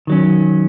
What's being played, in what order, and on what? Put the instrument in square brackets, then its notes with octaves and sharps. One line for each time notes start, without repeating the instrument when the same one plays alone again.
[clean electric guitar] D#3 F#3 C#4